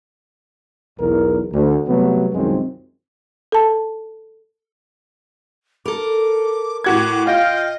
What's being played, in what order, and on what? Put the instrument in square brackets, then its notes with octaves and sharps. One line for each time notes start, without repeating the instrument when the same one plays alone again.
[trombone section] B1 E2 A#4
D2
C3 F#3 G3 A3 B3
C2 F#2 D#3 F3 G#3 C4
[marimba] A4 A5
[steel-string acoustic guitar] A4 A#4 [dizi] D6
[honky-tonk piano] A2 F#4 G#6 [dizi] D6
[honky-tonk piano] F4 [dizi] D#5 [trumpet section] F5 G5